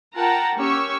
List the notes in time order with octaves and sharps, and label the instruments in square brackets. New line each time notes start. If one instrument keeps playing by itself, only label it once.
[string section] F4 A#4 F#5 G5 A5 A#5
A#3 C#4 G4 C#5 C#6 E6